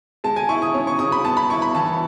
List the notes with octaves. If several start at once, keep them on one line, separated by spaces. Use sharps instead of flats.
G#3 A5
G#5
E4 C#6
D#6
C#4 D#6
C#6
C#3 D#6
B5
B3 A5
B5
E4 C#6
B5
E3 A5